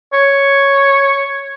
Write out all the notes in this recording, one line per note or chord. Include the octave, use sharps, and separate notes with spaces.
C#5